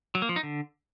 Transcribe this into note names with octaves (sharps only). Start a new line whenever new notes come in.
F#3
A#3
F3
D#4
D3